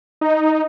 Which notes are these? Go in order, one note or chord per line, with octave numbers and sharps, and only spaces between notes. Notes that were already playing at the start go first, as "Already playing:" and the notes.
D#4